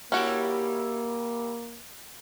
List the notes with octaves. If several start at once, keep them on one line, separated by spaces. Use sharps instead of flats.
G3 A#3 C#4 E4 F#4 G4